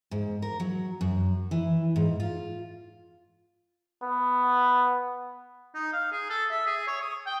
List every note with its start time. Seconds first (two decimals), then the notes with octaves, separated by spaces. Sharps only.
0.11 G#2
0.42 A#4
0.60 F#3
1.01 F#2
1.51 E3
1.96 G#2
2.20 F4
4.03 B3
5.75 D#4
5.93 F5
6.12 G#4
6.30 A4
6.51 E5
6.67 G#4
6.88 C#5
7.01 D#6
7.26 G5